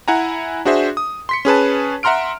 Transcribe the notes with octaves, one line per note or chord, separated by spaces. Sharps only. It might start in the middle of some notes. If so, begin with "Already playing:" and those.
E4 F#5 G#5 A#5
D4 F#4 G#4 C5 E5
D#6
C6 B6 C#7
C#4 G#4 B4 A5
E5 F#5 A#5 C6 F6 D7